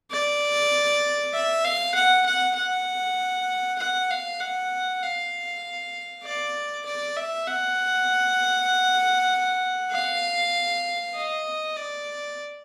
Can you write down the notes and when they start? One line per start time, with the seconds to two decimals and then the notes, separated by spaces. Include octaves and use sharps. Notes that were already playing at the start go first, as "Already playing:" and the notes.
0.11 D5
1.33 E5
1.64 F5
1.95 F#5
2.26 F#5
2.56 F#5
3.79 F#5
4.10 F5
4.40 F#5
5.02 F5
6.24 D5
6.86 D5
7.17 E5
7.47 F#5
9.92 F5
11.15 D#5
11.77 D5